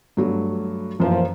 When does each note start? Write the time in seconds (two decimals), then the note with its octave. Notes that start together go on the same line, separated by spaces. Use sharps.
0.17 G2 F#3 A3
1.00 F#2 A#2 E3 F3 C5